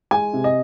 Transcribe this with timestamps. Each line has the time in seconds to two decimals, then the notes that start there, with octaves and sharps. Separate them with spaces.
0.11 G#3 G#5
0.33 C3
0.44 D#5